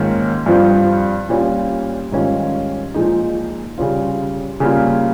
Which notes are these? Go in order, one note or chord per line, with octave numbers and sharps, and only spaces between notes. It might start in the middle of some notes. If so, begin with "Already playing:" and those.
Already playing: G#2 D#3 A#3 C#4 F4
G2 F3 C4 F4
A#2 G3 C#4 F4
G#2 D#3 G3 C#4 F4
A#2 F3 G#3 D#4
C#3 G3 C#4 F4
C#3 G3 A#3 F4